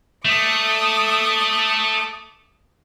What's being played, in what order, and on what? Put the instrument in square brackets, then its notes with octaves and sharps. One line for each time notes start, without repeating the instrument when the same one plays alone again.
[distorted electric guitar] A3 [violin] D6 D#6